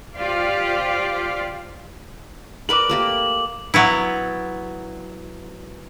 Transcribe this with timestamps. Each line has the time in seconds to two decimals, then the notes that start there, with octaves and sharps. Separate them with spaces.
0.16 F4 G4 C5 D5 F5
2.69 A#4 B4 D5 D6 F#7
2.89 A3 A#3 G4
3.74 F#3 B3 E4